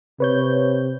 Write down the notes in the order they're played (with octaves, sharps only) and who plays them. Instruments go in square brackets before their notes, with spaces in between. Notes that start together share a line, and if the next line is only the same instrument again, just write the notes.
[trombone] C3 [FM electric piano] B4 C#5 G6